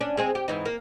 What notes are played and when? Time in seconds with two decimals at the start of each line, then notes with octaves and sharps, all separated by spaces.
0.01 C#4 D4
0.17 G#3 C4 G#4
0.35 G4
0.48 G#2 E3 D#4
0.65 A#3